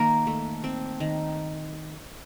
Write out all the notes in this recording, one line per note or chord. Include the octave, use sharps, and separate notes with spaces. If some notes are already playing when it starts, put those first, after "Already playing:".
Already playing: D#3 A#3 A#4
A3
C4
D#3